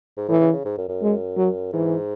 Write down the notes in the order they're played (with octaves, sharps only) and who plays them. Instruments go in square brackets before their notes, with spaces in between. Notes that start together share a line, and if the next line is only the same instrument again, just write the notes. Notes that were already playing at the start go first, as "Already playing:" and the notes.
[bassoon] G#2
[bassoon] A2 [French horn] E3
[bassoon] C#3
C#3
G#2
F#2
F#2
[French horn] G#3
F#3
[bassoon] G#2 [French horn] E3